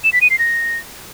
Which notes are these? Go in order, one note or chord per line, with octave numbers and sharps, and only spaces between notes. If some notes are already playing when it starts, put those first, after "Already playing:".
E7
B6
D#7
C7
A#6